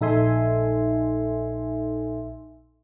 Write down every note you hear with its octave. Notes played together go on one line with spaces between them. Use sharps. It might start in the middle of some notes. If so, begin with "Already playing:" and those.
A#1 D#4 A4 E5 G#5 C6